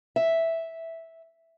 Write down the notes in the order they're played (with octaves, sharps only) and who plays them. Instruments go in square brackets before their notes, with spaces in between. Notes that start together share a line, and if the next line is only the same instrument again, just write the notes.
[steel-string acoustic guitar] E5